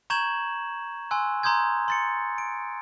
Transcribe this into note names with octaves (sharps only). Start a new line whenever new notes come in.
A#5 C#6 G6 G#6 E7 F#7
G#5 C6 E6 F#6
A#5 C6 D#6 G6 G#6
C6 A6 C#7
D7